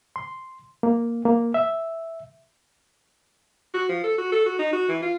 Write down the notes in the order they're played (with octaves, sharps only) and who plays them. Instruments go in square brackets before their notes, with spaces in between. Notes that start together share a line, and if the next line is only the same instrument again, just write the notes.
[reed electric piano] C6
A#3
A#3
E5
[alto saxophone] F#4
F3
A4
F#4
A4
F#4
D#4
F#4
E3
F4